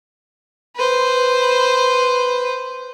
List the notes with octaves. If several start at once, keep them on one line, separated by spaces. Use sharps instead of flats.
B4 C5